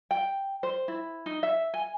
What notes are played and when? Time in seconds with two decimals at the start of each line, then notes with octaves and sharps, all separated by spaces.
0.11 G5
0.63 C5
0.88 E4
1.26 D#4
1.43 E5
1.74 G#5